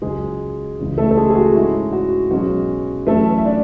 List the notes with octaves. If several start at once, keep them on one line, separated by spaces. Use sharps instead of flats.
C#2 C#3 F#3 G#3 G#4
C#2 C#3 E3
A3 A4
A4
G#3 G#4
G#4
F#4
G#2 G#3 C#4 E4
F#4
B1 B2 G#3 C#4 F#4
F#2 E3 A3 C#4 A4
E5
D4 D5